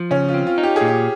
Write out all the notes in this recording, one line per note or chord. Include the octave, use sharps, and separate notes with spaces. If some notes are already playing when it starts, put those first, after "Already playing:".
Already playing: F3
C#3 C#4
F4
C4
F4
D#4
G4
G#4
A#2
G4